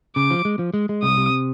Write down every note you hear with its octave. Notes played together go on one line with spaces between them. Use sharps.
C#3 D6
F3
G#3
F3
G#3
G#3
C2 D#6
C3